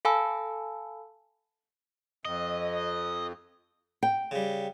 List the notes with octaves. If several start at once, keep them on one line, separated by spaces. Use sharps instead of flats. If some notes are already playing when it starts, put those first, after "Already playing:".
A4 F5 G#5 A5 B5 E6
F2 D#5
G5
C#3 G3